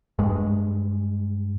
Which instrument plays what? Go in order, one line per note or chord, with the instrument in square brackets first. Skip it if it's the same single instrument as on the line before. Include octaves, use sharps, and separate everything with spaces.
[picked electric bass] G2 G#3